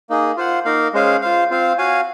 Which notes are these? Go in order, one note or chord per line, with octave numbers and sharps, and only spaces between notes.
A#3 D#4 G#4
F4 C5 F#5
A#3 D#4 A#4 F5
G#3 C#4 G#4 C5 F5
F4 C5 F5
C4 F4 C5 F5
F#4 C#5 F5 G#5